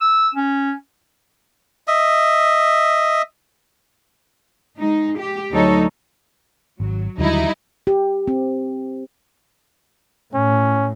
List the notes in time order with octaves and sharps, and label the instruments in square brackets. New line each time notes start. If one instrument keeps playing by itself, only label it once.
[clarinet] E6
C#4
[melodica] D#5 E5
[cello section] G#3 D#4
G4
D2 F#3 D#4 A4 C#5
[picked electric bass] G#1 [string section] F#3
[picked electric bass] D#2 D3 F#3 [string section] G3 D#4 E4
[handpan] G4
C4
[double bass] A2 [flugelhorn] C#4